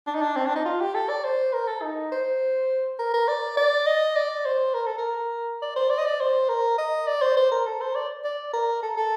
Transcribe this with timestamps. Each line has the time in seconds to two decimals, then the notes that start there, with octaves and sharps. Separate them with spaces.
0.07 D4
0.14 D#4
0.22 D4
0.36 C4
0.46 D4
0.56 D#4
0.65 F4
0.81 G4
0.95 A4
1.09 D5
1.24 C5
1.53 A#4
1.68 A4
1.82 D#4
2.12 C5
2.99 A#4
3.14 A#4
3.28 D5
3.57 D5
3.87 D#5
4.16 D5
4.45 C5
4.74 A#4
4.86 A4
4.98 A#4
5.62 D5
5.76 C5
5.90 D5
5.98 D#5
6.06 D5
6.20 C5
6.49 A#4
6.78 D#5
7.07 D5
7.22 C5
7.37 C5
7.52 A#4
7.66 A4
7.81 C5
7.95 D5
8.24 D5
8.53 A#4
8.82 A4
8.97 A4